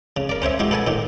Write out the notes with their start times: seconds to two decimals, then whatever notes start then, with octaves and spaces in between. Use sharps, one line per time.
0.17 C#3
0.29 A#4 D5
0.42 C#4 C5 C#5 E5
0.59 G#3 E4 F#4 G4
0.71 A4 B4 F#5 G#5 A5
0.87 A2 D#3 G4